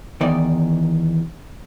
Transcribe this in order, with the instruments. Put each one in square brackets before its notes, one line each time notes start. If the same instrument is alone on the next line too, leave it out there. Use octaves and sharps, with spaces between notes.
[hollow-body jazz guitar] E2 D#3 D#4 D5